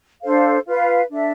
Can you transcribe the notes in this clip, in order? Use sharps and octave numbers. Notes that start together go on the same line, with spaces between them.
D4 A4 C5 F5
F4 B4 F5
D4 A4 E5